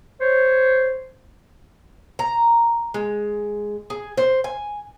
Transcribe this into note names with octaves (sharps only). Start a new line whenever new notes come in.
C5 C#5
A#5
G#3
G#4
C5
G#5